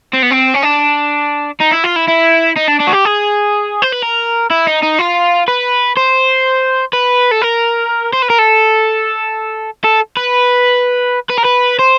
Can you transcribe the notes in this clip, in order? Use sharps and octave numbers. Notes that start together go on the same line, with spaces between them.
C4
B3
C4
C#4
D4
D#4
E4
F4
E4
E4
D#4
D4
D4
F#4
G4
G#4
C5
B4
A#4
E4
D#4
D#4
F4
B4
C5
B4
A4
A#4
C5
B4
A#4
A4
A4
B4
B4
A#4
B4
C5